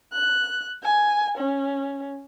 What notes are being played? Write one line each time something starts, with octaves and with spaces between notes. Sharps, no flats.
F#6
G#5
C#4